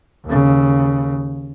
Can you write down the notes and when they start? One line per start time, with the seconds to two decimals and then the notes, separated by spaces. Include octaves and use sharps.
0.25 D#2 C#3